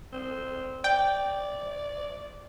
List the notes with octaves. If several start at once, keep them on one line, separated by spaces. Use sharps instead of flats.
C4
D5 G5